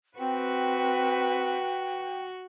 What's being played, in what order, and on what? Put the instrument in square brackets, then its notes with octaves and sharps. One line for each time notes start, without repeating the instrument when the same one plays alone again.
[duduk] C4 [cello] F#4 [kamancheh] B4 [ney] G5